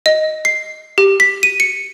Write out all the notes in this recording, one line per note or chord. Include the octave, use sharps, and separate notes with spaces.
D#5
C7
G4
B6
D#7
C#7